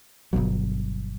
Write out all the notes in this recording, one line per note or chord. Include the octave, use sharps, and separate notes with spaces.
G1 C#2 B2 F#3